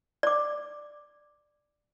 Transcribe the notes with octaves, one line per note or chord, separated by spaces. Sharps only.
D5 D6